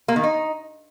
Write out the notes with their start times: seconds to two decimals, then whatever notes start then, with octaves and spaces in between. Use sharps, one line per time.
0.08 A#3
0.16 D#3
0.23 D#4